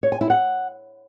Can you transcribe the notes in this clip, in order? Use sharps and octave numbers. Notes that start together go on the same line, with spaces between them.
C#5
G#5
E4
F#5